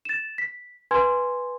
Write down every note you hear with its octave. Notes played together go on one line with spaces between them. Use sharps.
A6 E7
B6
B4 G#5 C6 G#6